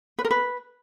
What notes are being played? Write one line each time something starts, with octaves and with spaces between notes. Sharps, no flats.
B4
A#4
B4